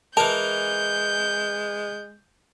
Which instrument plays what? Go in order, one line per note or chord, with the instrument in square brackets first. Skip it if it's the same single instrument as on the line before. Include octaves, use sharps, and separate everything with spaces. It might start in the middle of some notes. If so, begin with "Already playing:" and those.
[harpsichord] E3 A#4 [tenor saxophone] G#3 [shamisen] A5 [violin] G6